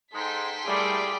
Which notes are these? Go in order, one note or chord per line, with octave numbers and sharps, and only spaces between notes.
G#2 G#3 D#4 A4 G5 C6 B6
G3 A3 A#3 E4 G#4 D5